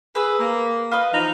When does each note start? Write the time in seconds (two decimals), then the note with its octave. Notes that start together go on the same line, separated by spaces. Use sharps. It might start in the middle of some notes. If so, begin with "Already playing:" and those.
0.15 G#4 B4 E6
0.39 A#3
0.91 F4 B4 D#5
1.12 E3 F3 D#4